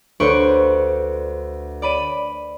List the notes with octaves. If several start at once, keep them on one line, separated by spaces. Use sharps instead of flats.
D2 B4 C5 C#6 D7
D5 B5 D#7